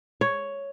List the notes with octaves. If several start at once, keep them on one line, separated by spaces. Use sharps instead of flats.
C#5